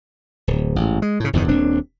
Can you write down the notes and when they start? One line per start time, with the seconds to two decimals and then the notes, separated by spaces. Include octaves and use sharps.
0.47 D1
0.76 A1 G#2
1.02 G#3
1.20 A2 C#3
1.33 F#1 E2 G2 D#3
1.48 D#1 C4 D4